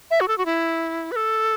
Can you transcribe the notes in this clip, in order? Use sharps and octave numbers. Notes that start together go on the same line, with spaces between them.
E5
F#4
A4
F#4
E4
B4
A4